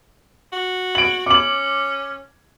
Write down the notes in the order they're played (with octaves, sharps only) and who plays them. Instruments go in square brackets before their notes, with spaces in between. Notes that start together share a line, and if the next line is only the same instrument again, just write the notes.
[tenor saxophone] F#4
[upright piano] D7 F#7
[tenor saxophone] C#4 [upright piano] D6 F#7